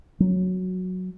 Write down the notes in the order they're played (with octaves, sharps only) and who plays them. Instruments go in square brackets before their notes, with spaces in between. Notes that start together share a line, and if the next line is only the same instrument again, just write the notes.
[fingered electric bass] F#3